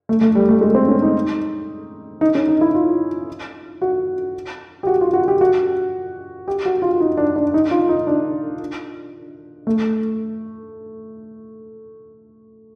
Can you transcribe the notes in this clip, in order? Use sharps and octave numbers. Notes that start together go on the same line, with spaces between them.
A3
A3
G3
A3
G#3
C4
C#4
D#4
D#4
C#4
D#4
E4
F4
F#4
G4
F#4
F4
F#4
G4
F#4
G4
F#4
F4
D#4
D4
D4
D#4
F4
D#4
D4
A3